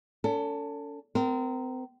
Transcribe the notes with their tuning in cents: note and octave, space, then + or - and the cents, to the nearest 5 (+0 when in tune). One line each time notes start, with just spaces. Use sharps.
C#4 +45 A4 +30
C4 -35 A#4 -5